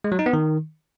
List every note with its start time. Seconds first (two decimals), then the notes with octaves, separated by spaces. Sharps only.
0.04 G#3
0.12 F#3
0.19 D#4
0.26 B3
0.33 D#3